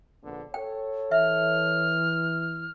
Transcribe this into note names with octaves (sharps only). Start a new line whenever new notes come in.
A#1 D3 B3
A4 C#5 G5
E3 E5 F6